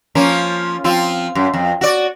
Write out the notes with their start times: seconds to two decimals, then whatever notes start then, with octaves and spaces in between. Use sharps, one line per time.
0.15 F3 A#3 C#4
0.84 F3 C4 F4
1.35 F#2
1.54 F2
1.81 F#4 D5